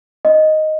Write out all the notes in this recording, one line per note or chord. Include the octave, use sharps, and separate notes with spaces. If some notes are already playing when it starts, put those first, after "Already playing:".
D#5